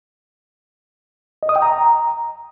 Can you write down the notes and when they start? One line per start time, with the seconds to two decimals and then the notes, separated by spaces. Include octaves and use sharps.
1.43 D#5
1.49 D#6
1.56 G5
1.62 A#5